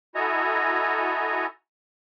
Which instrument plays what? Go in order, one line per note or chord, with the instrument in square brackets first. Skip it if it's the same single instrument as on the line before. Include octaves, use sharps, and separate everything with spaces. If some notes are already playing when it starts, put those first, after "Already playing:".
[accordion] E4 F#4 A4 D#5 G#5 A#5